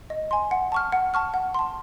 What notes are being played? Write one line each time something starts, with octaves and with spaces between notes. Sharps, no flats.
D#5
G#5 C6
F#5
A5 C#6 F6
F#5
A5 C#6 F6
F#5
A5 C6